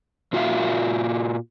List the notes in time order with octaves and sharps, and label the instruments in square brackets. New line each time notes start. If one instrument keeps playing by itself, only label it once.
[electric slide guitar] A#2 F4 F#4 E5 F5